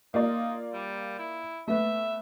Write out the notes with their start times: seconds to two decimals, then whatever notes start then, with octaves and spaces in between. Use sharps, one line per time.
0.14 A#3 D#4 F4 D5
0.73 G3
1.19 E4
1.68 A3 B3 E5